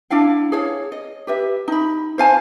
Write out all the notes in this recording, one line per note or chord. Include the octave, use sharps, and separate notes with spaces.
D4 E4 F5 F#5
G#4 C#5 F5
D#5
G4 B4 E5
D#4 B5
C5 F5 G#5 A5